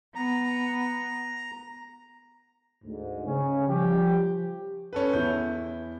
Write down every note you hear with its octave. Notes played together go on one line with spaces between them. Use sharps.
B3 A#5
D2 G#2
C#3 C#4
F3 G3 G4
C#4 A4 B4
E2 E4 G6